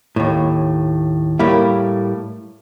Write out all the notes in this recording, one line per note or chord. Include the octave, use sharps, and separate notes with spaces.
D#2 A2
A2 G3 A#3 E4